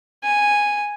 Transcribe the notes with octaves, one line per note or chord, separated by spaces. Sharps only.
G#5